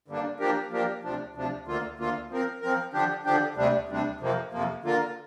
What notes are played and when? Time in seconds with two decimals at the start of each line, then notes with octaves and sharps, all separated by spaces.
0.08 G2 D3 G3 A#3 D4
0.39 F3 A#3 D4 G4 A#4
0.71 F3 A#3 D4 G4 A#4
1.03 D2 C3 F3 D4
1.35 D2 C3 F3 D4
1.66 D2 D3 A#3 F4
1.98 D2 D3 A#3 F4
2.30 F3 C4 A#4
2.61 F3 C4 A#4
2.93 D3 F3 D4 G4
3.24 D3 F3 D4 G4
3.56 D2 C3 G3 D4
3.88 D2 C3 G3 D4
4.20 F2 C3 F3 A#3
4.52 F2 C3 F3 A#3
4.84 D3 A#3 F4 A#4